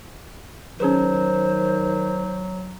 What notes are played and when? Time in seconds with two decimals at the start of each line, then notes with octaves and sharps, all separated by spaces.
0.80 D#3 F#3 C#4 G#4 B4 C5